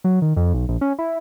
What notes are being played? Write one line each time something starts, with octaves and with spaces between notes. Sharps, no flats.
F#3
D#3
F2
B1
A#1
C#4
E4